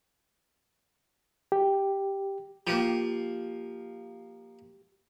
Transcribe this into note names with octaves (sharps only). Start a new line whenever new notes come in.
G4
F3 A#3 G4